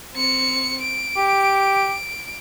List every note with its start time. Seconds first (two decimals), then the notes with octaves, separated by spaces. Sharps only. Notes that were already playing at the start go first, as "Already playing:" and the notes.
0.14 C4 C#7
0.82 D7
1.17 G4